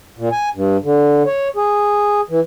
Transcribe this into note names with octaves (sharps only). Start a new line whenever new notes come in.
A#2
G#5
G2
D3
C#5
G#4
E3